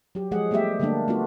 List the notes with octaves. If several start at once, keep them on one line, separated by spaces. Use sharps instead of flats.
F#3 G4
F3 G#3 G#4 F#5
G3 A3 B3 G4 E5
D3 G3 A3 A#3 D4
A3 B3 D4 F4 F#4